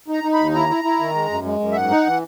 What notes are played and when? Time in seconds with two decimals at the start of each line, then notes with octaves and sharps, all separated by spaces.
0.08 D#4
0.13 A#5
0.24 D#4
0.33 B5
0.39 D#2
0.54 E4 A#5
0.69 E4
0.84 E4
1.00 D#3
1.15 G#3
1.30 F#2
1.45 G#3
1.60 F#2
1.72 E5
1.76 G#2 F#5
1.91 D#4
2.07 E3